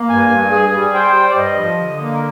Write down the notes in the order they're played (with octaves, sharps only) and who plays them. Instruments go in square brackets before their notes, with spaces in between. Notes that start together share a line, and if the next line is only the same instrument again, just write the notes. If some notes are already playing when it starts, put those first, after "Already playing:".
Already playing: [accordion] A#3
[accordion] G2 [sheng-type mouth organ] G#5
[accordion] G2
G#4
G3
[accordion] C5 [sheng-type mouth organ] G5
[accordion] G3
[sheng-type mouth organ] D5
[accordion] G2 [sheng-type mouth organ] D#5
[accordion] F3
D3
A#3
[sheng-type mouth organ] A#4